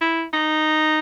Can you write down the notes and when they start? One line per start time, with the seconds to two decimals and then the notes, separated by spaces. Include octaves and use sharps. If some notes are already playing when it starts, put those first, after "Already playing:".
0.01 E4
0.33 D#4